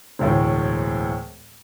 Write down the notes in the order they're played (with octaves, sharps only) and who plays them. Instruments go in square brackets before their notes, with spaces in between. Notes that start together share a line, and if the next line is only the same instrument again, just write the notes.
[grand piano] E1 D2 A2